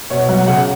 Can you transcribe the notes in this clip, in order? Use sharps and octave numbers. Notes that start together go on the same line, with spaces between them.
B2 C#5
F#3 F#5
C#3 F#5